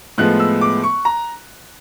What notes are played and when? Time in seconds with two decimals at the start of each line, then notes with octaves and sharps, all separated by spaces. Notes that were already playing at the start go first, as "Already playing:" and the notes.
0.18 A2 F3 G#3 B3 F#6
0.40 E6
0.61 D6
0.83 C#6
1.05 A#5